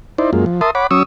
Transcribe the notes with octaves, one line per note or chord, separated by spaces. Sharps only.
D#4 E4 C5 D5
F#2 G#3 A#3 F4
F3
A#4 E5 A5 C6 D#6
C#5 F#5 B5 D6
F#3 C#4 C#6 D#6 E6